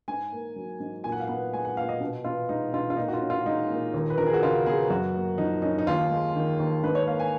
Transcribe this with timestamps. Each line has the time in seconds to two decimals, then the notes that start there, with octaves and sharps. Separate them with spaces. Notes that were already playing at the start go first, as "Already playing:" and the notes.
0.08 G#2 G#5
0.32 A#3
0.56 F#3
0.80 G#2
1.04 A#2 G#5
1.12 F#5
1.20 F5
1.28 B3 F#5
1.53 G#3 G#5
1.65 F#5
1.77 A#2 F5
1.89 D#5
2.00 B2
2.25 B3 F4
2.49 G#3 D#4
2.73 B2 F4
2.90 F4
2.97 A#2 D#4
3.08 F#4
3.13 F4
3.21 C#4
3.30 F4
3.45 G#3 D#4
3.70 A#2
3.94 D#2
4.10 B4
4.18 F3 A#4
4.26 G#4
4.34 F#4
4.43 C#3 F4
4.66 B3 G#4
4.90 F#2 F#4
5.15 A#3
5.38 F3 D#4
5.62 C#4 D#4
5.79 D#4
5.87 D#2 F4
6.11 G#3
6.35 D#3
6.60 D#2
6.83 G#2 B4
6.95 C#5
7.07 A#3 F5
7.20 G#5